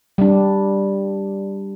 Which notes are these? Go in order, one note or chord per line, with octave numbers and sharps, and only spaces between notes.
G3 D4